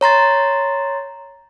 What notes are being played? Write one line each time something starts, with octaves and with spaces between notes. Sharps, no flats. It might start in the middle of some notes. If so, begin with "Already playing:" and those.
C#5 A#5 C6 A6